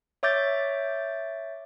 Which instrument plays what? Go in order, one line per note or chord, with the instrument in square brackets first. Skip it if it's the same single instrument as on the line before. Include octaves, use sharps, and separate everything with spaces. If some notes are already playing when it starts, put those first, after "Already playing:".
[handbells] C#5 E5 D6 G6 A6